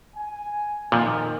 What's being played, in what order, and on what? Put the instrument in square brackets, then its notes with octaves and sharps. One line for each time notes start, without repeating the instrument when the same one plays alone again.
[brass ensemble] G#5
[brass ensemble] F2 D#3 [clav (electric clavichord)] A#2 F3